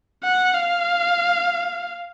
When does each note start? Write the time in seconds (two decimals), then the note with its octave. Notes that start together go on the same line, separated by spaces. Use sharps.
0.23 F#5
0.53 F5